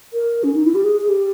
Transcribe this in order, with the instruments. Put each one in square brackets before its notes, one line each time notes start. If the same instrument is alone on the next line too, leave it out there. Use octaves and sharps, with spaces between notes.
[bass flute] A#4
C#4
D#4
E4
G4
G#4
G#4
G4